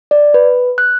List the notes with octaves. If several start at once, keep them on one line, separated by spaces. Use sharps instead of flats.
D5
B4
F#6